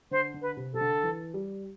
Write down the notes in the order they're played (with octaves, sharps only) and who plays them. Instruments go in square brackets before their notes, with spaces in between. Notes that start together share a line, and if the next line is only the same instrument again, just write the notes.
[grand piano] D3 [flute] C5
[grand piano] D3
[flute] B4
[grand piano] C3
[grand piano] C3 [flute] A4
[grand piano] D3
E3
G3